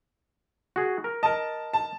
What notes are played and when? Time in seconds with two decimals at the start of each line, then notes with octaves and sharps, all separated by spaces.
0.76 F#4 G#4
1.04 A#4
1.23 A#4 D#5 A5
1.73 A5